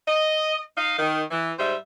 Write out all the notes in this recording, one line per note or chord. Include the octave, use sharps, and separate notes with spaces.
D#5
D#4 D#5 F5
D#3
E3
G#2 G3 C5 E5